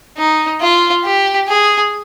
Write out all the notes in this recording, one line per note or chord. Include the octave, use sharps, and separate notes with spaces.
D#4
F4
G4
G#4